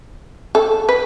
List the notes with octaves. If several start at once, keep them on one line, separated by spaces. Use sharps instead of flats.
A4
B4